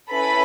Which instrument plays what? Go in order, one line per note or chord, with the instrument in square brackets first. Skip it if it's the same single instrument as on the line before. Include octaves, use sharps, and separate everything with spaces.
[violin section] C#4 E4 A4 B4 B5